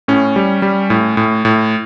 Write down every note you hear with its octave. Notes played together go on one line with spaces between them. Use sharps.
A2 C#4
G3
G3
A2
A2
A2